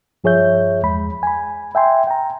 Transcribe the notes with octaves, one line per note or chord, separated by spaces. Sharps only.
G2 F3 G#4 C#5 E5 G6
E2 G#3 B5
G#5 B5
E5 G5 G#5 C6
G5 A#5